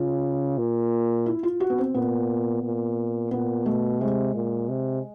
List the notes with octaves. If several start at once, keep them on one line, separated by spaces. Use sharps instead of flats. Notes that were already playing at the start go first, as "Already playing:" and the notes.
Already playing: C#3 F4
A#2
E4
F4
F#4
B3
C4
A#2 B3
A#2
A#2 B3
B2 A3
C3 G#3
A#2
C3